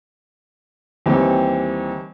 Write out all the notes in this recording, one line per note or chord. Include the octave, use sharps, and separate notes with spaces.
D#2 E3 G3 C4